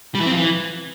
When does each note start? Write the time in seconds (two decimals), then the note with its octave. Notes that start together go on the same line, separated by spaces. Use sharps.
0.15 G3
0.20 E3
0.26 C4
0.31 F3
0.37 E3